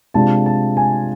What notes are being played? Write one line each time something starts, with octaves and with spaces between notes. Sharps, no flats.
C3 G#3 D4 F4 A5
A5
G#5